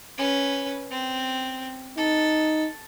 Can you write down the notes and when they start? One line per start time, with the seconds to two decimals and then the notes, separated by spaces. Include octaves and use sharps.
0.18 C#4 B4
0.91 C4
1.98 D#4 A4